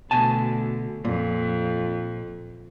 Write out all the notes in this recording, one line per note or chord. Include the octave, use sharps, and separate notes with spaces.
D2 B2 G#5 A5
F2 A#2